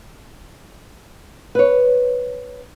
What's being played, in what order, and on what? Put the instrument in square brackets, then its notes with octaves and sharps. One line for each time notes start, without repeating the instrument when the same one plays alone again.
[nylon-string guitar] B4 C#5